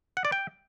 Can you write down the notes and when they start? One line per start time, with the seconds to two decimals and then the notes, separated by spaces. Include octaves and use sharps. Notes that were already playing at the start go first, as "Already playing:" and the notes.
0.17 F#5
0.25 D5
0.32 G5